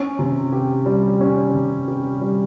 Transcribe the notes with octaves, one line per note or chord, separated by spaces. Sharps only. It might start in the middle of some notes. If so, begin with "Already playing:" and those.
Already playing: C#4
C3
G4
G3
C#4
C3
G4
G3